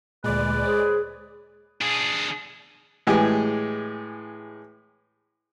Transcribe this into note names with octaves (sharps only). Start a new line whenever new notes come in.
D2 A#2 G#3 B4 D5
G#4 C5 C#5
D4 G#4
A2 E3 G#3 G4 G#4